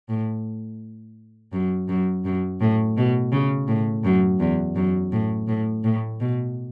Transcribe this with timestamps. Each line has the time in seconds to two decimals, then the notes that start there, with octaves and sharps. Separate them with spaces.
0.09 A2
1.53 F#2
1.89 F#2
2.25 F#2
2.61 A2
2.97 B2
3.32 C#3
3.68 A2
4.04 F#2
4.40 E2
4.76 F#2
5.12 A2
5.48 A2
5.84 A2
6.20 B2